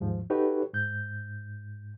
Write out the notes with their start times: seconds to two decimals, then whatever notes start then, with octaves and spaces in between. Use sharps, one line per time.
0.01 D#2 G#2 F3
0.30 D#4 F#4 G4 A4 B4 C#5
0.74 G#2 G6